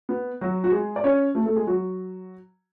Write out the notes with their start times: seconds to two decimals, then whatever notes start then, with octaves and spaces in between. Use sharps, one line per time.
0.09 B3
0.41 F#3 F#4
0.64 F#4
0.72 G#3 G#4
0.96 D5
1.04 C#4 C#5
1.35 A3 A4
1.46 A3 A4
1.56 G#3 G#4
1.67 F#3 F#4